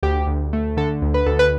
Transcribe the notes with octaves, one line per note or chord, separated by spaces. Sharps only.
D2 G4
D2
A3
D3 A4
D2
B4
D2 A4
B4